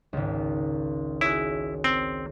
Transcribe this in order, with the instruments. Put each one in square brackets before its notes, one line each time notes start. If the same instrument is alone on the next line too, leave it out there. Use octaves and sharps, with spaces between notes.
[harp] G#1 C#2
[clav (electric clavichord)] E4 [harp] F#4 G#4 C#5
[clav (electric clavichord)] C4